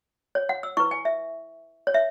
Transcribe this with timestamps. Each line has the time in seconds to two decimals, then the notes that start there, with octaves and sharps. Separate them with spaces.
0.35 C#5
0.49 F#5
0.63 E6
0.77 E4 B4 C#6
0.91 G#5
1.05 E5
1.87 C#5
1.94 E5